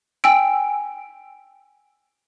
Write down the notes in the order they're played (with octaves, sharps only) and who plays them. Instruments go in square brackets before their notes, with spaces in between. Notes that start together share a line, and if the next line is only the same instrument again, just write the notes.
[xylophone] G5 G#5 E6 D7